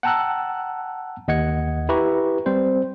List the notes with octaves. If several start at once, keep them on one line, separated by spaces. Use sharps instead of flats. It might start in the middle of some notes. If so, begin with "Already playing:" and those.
F#5 G5 A5 A#5 E6 F#6
D#2 D#5 F#5 G#6 C#7
E4 G4 B4 A#5 C#6
G3 C4 C5